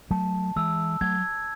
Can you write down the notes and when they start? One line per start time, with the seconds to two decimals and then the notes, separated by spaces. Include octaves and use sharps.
0.11 F#3 A3 A5
0.56 E3 G#3 E6
1.01 F#3 A3 G#6